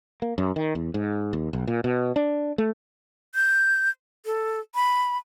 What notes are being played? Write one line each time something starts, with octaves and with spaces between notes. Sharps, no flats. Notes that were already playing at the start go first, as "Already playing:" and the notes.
A#3
F#2
D#3
E2
G#2
D#2
B1
A#2
B2
D4
A3
G6
A4
B5